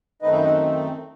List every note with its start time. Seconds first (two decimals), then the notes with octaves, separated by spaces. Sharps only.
0.22 F#2 D#3 A3 C4 D#4 B4 D#5
0.32 C5 E5
0.43 D#5 F#5